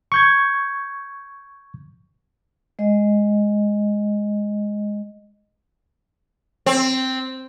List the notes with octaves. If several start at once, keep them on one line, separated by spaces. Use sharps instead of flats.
C#6 G6 G#6
G#3 D#5
C4